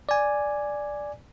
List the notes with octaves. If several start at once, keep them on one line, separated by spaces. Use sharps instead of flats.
D5 G#5